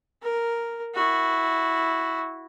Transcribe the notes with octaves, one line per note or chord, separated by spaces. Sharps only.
A#4
E4 F#4